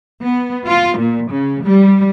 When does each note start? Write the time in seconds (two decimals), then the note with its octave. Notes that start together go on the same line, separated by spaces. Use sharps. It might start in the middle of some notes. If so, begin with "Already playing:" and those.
0.22 B3
0.66 F4
0.98 A#2
1.29 C#3
1.63 G3